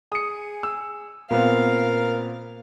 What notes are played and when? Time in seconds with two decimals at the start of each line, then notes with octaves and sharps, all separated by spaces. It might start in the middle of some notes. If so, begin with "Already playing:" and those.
0.12 G#4 D#6 C#7
0.63 E6
1.30 A#2 B3 C4 A#4 F5